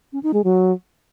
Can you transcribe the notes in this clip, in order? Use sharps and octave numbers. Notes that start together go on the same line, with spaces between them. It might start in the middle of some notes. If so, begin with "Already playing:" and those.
C#4
D#4
G#3
F#3